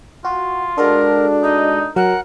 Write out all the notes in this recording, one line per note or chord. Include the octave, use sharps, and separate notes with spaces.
F4 F#4
G#3 D4 F#4 A4 A#4
D#4 D#5
F#3 A#4 F#5